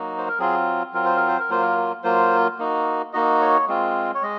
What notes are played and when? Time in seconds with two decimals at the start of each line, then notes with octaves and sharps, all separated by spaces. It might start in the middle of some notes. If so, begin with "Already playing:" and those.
Already playing: F#3 A#3 D#4 F#4
0.18 C5
0.28 A#4
0.39 F#3 C4 F4 G#4
0.93 F#3 C4 F4 A#4
1.05 C5
1.16 A#4
1.28 C5
1.39 A#4
1.49 F#3 A#3 F4 C5
1.62 A#4
2.04 F#3 A#3 F4 C5
2.59 A#3 D#4 F#4
3.13 A#3 D#4 F#4 D#5
3.41 C#5
3.68 G#3 C4 F4
4.15 C#5
4.23 G#3 D#5